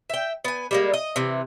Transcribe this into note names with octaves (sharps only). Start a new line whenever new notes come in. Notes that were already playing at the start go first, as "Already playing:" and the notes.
E5 G5
B3 G#5
G3 G#3 A#3
D#5
C3 E3